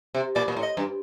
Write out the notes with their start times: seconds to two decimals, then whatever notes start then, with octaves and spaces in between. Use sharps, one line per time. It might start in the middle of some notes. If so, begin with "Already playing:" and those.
0.15 C3
0.35 A#2 D5
0.48 A#2
0.57 A2
0.63 D#5
0.77 G2